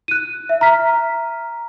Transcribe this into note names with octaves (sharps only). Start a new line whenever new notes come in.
F#6 D#7
E5
A#5 F6 B6